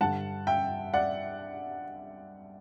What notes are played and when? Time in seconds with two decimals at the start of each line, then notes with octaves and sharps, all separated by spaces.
0.01 G2 D3 F#5 A5
0.47 E5 G5
0.94 D5 F#5